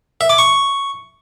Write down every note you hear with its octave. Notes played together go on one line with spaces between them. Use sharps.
E5
D6
C#6